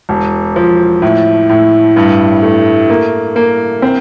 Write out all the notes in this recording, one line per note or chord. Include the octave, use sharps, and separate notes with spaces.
E1
F3
A2
A2
G2
A3
A#3
A#3
C4